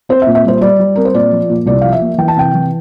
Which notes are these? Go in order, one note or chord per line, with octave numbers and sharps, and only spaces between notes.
C4 C5
E5
A#2
E5
G3 C5
G3 D5
G3
C4 A#4
C5
A#2 D5
F3
A#2
C2 D5
F3 F5
E5
A#3
E3 G5
A5
C3 G5
E3